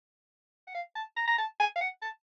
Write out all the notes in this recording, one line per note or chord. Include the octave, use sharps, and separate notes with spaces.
F#5
F5
A5
A#5
A#5
A5
G#5
F5
F#5
A5